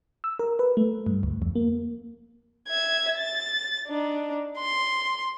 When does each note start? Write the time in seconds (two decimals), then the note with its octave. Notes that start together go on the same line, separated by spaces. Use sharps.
0.24 E6
0.39 A#4
0.59 B4
0.77 A3
1.06 G2
1.23 D2
1.42 F2
1.55 A#3
2.69 E5 G#6
3.18 A6
3.87 D4 D#4
4.58 C6